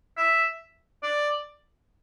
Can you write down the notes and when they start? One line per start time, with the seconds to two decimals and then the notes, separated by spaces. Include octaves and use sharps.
0.17 E5
1.03 D5